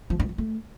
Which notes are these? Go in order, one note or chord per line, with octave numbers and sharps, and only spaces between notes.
F3
G2
F#3
A3